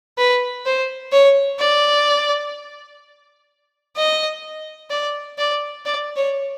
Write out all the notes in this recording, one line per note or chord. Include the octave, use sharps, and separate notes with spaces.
B4
C5
C#5
D5
D#5
D5
D5
D5
C#5